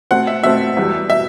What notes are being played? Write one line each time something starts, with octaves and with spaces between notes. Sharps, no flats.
B2 A3 C4 F#5
E5
B2 A3 C4 E5
E2 B2 G3
B2 E5